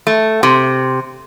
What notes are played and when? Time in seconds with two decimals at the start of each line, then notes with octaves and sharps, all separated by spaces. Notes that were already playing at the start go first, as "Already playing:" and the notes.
0.07 A3
0.43 C3